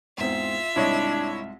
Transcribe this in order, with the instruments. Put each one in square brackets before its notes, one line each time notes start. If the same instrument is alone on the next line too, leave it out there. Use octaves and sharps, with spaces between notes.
[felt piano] E2 G#2 C4 [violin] F4 E5
[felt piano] C2 G#2 [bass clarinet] D4 [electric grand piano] E4 C#5 D#5